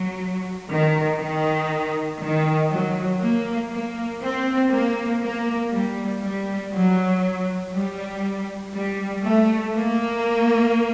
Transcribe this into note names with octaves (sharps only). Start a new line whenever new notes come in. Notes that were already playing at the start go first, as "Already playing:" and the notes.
Already playing: F#3
D#3
D#3
D#3
F#3
A#3
A#3
C4
A#3
A#3
G3
G3
F#3
G3
G3
A3
A#3